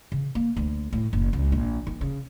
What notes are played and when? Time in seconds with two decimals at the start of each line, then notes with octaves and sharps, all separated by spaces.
0.12 C#3
0.35 A#3
0.57 D2
0.93 A2
1.13 F#1
1.33 C#2
1.52 A#1
1.87 D#3
2.01 C#3